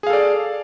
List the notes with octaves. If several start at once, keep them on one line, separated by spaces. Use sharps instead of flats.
G#4 A4 D5 F5